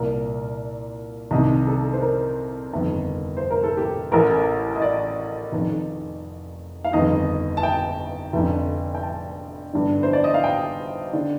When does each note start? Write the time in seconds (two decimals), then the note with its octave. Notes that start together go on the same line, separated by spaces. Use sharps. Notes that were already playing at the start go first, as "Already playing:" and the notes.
Already playing: C2 A#2 A#4
1.31 C2 C3 D#3 D#5
1.67 A4
1.93 C5
2.01 A#4
2.71 G1 F2 D#3
3.37 C5
3.51 A#4
3.63 A4
3.77 G4
4.12 A1 A2 A#4
4.75 D#5
4.82 D5
5.52 F1 F2 D#3
6.84 F5
6.92 G1 F2 D#3 D#5
7.57 A5
7.63 G5
8.33 F1 F2 D3
8.95 G5
9.03 A5
9.73 G1 G2 D3
10.03 C5
10.13 D5
10.24 D#5
10.34 F5
10.44 G5
11.13 D3